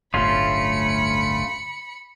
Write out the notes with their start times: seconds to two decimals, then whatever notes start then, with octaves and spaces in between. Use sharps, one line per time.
0.14 D1 G1 D2 A3 C#4 F4 B5 C#7